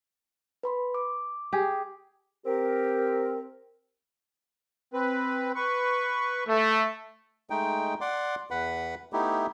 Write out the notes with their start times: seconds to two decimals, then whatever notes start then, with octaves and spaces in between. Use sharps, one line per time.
0.63 B4 B5 C6
0.94 D6
1.53 G4 G#4
2.45 C4 G4 A#4
4.93 C4 B4
5.55 B4 C#6
6.48 A3
7.50 G#3 A3 D#4 G5
8.01 D5 F#5 C6 D6
8.51 E2 B4 F#5 B5
9.13 A3 B3 D#4 E4 G4